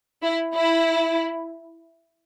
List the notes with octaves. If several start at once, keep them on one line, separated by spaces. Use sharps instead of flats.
E4
E4